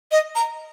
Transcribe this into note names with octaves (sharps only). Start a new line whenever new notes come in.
D#5
A#5